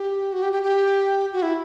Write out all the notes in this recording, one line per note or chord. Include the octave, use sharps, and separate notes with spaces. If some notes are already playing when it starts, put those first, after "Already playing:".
Already playing: G4
F#4
G4
G4
G4
F#4
E4